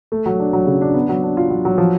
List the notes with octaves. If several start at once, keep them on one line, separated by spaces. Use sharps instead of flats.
A3
F#3
D4
F#3
C#3
D4
B3
F#3
D4
F4
F#3
F#3
F3